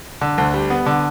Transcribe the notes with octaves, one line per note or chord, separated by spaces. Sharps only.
D3
D2
G3
B3
D3